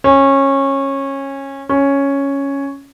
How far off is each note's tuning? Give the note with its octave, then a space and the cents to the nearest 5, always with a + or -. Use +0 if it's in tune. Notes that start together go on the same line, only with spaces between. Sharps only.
C#4 -20
C#4 +0